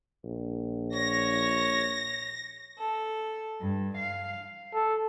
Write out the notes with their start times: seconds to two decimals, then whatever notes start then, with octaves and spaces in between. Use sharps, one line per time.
0.24 A#1
0.93 C#5 A#6
2.78 A4
3.61 G2
3.97 F5
4.74 A4